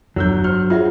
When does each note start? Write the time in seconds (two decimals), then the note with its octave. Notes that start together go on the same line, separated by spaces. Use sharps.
0.16 G1 F#3 E6 G6
0.44 G4 C5 F6
0.70 F4 G#4 E5 F#5